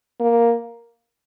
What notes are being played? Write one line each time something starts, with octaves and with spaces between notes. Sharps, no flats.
A#3